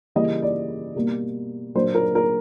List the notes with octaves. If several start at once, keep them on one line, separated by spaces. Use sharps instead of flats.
C#3 E3 G3 A#3 D#5
D5
B2 G3 A#3
A#2 F#3 A#3 D4 C5
A#4
A#4